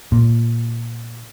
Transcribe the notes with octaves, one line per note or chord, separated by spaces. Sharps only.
A#2